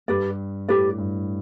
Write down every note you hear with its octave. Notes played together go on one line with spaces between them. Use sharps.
G2 G4 B4 D5
A2 G4 B4 D5
G2